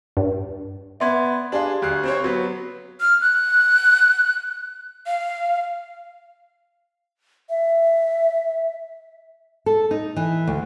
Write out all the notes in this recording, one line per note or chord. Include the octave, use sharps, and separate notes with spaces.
G2
B3 D5 E5 C6 G#6
D4 G4 G#4 F5 C6
D2 F#6 C7
C4 C5 C#5
F#3 B3
F6
F#6
F5
E5
A4
D#4
E3
D2